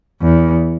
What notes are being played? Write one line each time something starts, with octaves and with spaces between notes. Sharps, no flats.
E2